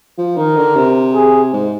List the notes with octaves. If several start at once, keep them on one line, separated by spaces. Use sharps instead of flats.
F3
D#3 A#4
D3
C3
G#4
G#2